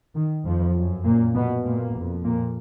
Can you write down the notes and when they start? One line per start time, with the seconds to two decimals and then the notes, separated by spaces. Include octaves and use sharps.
0.15 D#3
0.45 F2 F3
0.75 F#2
1.05 A#2 A#3
1.34 B2 B3
1.64 A#2 A#3
1.95 F2
2.25 A#2 A#3